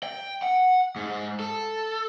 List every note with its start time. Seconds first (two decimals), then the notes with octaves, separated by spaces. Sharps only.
0.03 G5
0.42 F#5
0.96 G#2
1.40 A4